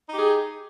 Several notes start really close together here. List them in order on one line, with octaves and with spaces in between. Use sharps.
D#4 G4 G#4